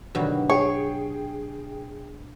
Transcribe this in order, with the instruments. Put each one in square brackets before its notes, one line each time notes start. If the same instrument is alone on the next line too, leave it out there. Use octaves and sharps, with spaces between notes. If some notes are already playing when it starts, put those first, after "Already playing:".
[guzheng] G2 B2 F#3 [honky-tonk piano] D3 D#3
[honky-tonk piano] G#4 G5 [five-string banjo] C#5